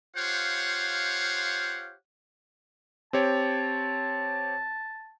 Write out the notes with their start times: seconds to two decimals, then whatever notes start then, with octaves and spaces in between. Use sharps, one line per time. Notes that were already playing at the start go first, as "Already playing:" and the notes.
0.16 F4 G4 C5 C#5 F5 F#5
3.13 C4 G4 C#5 A5